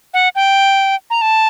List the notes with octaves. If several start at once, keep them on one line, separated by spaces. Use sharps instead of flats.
F#5
G5
A#5
A5